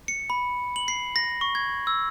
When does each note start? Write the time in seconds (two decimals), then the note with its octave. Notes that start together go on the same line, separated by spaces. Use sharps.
0.08 C#7
0.30 B5
0.76 F#7
0.88 C7
1.16 A#6
1.41 C#6
1.55 G#6
1.87 E6